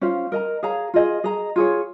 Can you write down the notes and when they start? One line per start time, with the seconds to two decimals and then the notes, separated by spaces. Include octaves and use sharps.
0.01 C#4 F4 C5 F5
0.32 A#4 D#5 A#5
0.63 G#4 C#5 F5 A#5
0.94 F4 G#4 D#5
1.24 G#4 D#5 A#5
1.56 F4 G#4 C#5